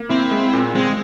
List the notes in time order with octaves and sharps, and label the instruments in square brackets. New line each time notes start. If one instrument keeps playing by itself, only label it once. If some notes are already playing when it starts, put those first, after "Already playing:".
Already playing: [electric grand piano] A#3
[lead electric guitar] C4 [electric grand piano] E4
[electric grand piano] G#3
A#2
[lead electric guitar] G#3 [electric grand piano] C4